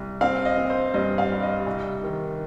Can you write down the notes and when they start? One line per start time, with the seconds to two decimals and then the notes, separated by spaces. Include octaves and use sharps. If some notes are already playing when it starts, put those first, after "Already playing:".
Already playing: C2
0.21 C4 F5
0.45 D#5
0.57 C4
0.70 C5
0.94 G2 D#5
1.18 F5
1.30 G3
1.43 D#5
1.66 C2
2.03 D#3